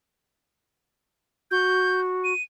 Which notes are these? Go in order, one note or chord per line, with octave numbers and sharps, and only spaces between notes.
F#4 G6
D#7